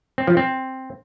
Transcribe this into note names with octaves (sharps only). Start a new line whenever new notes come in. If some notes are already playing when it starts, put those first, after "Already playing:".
C4
F3
C4